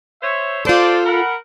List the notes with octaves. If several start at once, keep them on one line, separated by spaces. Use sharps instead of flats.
C5 C#5 E5
F4 A4 C5 D5
A#4 F#5 B5